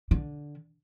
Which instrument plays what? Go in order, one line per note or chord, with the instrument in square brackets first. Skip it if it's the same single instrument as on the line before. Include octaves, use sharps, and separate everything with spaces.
[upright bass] D3